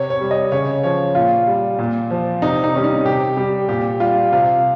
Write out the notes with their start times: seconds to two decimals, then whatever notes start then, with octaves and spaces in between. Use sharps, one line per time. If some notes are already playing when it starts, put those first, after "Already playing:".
Already playing: C3 C#5
0.10 C#5
0.21 G3
0.31 D#5
0.52 C#3 C#5
0.83 F3 C#5
1.15 A#2 F4
1.47 G3
1.79 A#2
2.11 F3
2.42 C3 D#4
2.64 D#4
2.74 D#3 G3 C#4
2.84 D#4
3.05 C3 G4
3.37 G3 G4
3.69 A#2 G4
4.00 G3 F4
4.33 C3 F4